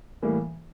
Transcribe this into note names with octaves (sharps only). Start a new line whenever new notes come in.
A2 E3 G3 A#3